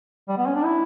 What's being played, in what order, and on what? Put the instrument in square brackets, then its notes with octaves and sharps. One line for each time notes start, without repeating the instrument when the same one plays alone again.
[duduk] G3
B3
C#4
D4
E4